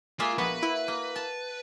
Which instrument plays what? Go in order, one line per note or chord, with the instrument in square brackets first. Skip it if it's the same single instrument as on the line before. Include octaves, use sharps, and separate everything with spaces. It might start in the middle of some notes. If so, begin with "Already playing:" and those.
[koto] G#3 A#3 E5 [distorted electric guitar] F4
[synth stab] A#1 B3 [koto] F#4 [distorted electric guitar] B4
[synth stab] E4
[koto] A#3
A5